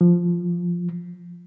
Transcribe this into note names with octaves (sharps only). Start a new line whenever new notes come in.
F3